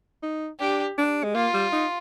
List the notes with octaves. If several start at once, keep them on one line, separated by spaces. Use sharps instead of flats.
D#4
D4 G4
D4
G#3
A#3 F4
G3
D#4